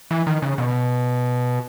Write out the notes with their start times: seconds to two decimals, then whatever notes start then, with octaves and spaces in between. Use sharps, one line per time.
0.11 E3
0.27 D#3
0.42 C#3
0.58 B2